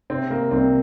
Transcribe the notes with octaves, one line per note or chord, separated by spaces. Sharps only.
C3 C4
A#3
C2 C4